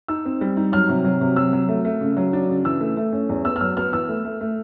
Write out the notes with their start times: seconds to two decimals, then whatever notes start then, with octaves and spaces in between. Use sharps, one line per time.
0.08 D#4 E6
0.25 C4
0.41 G3
0.57 D#4
0.72 F#3 F6
0.89 C3
1.05 F#3
1.21 C3
1.36 F#3 E6
1.53 F#3
1.69 A3
1.85 A3
2.01 C#3
2.17 F#3
2.33 D4
2.49 C#3
2.65 E3 E6
2.80 A3
2.97 A3
3.12 C#4
3.29 E2
3.45 B3 E6
3.56 F6
3.61 F#3 E6
3.77 B3 F6
3.93 E3 E6
4.09 A3
4.25 A3
4.41 A3